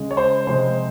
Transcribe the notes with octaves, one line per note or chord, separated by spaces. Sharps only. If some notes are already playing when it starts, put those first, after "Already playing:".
Already playing: C#3 G#3
C#5
C5
C3 F3 G#3 C5